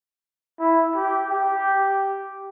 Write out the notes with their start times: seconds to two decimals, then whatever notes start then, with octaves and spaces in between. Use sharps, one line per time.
0.60 E4
0.95 G4
1.30 G4